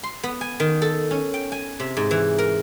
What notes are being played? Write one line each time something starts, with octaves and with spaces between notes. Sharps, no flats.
C6
B3
G#5
D#3
A4
C#4
G5
G#5
C3
G#2
E3
A#4